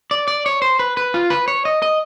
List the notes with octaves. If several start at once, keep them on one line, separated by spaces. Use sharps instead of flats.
D5
D5
C#5
C5
B4
B4
F4
B4
C#5
D#5
D#5